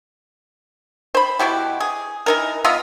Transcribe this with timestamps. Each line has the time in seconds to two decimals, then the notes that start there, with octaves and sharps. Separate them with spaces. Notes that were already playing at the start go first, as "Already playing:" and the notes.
1.15 C5 B5
1.39 B2 E4 F#4 G4
1.80 G#4
2.26 E3 D#4 A#4
2.64 B3 F4 D#5 E5